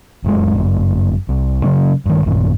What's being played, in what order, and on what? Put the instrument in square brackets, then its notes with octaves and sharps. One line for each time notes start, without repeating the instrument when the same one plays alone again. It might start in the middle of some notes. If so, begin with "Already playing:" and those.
[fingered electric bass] F1 F#2 G#3
G1 F#2
C2
C#3 F#3 C#4
G2 D#3
A1 F#2 A#2 D#3